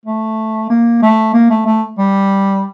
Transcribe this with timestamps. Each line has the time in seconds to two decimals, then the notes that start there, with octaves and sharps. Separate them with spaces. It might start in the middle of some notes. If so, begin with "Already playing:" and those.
0.06 A3
0.70 A#3
1.02 A3
1.34 A#3
1.50 A3
1.66 A3
1.98 G3